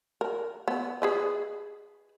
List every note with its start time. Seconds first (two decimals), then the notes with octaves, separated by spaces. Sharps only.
0.21 A#4
0.68 B3
1.02 G#4 B4 D#5